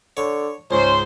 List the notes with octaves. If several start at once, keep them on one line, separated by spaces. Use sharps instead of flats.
D3 C#5
C#2 G#2 C#4 C5